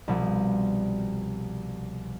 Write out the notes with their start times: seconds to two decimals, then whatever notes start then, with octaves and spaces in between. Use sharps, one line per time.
0.08 C2 B2 F3